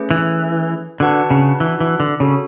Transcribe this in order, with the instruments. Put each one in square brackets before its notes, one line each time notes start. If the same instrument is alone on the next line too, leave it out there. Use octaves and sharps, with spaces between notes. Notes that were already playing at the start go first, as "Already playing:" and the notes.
Already playing: [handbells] A3 C#4 G#4 B4
[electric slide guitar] E3
[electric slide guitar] D3 [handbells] D4 F#4 B4 F#5 A5
[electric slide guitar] C#3
E3
E3
D3
[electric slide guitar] C#3 [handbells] F#4 A4 C#5